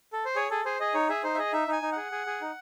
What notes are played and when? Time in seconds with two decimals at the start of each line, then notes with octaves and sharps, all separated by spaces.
0.13 A4
0.25 C5
0.36 G#4 C#5
0.50 G#4 A4
0.65 G#4 C5
0.80 G#4 D#5
0.94 D#4 C#5
1.09 G#4 E5
1.23 D#4 C5
1.34 E5
1.38 G#4 D#5
1.53 D#4 E5
1.68 D#4 G#5
1.82 D#4
1.92 G#4 F#5
2.12 G#4
2.26 G#4
2.41 D#4